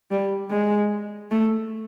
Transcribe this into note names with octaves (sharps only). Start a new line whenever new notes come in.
G3
G#3
A3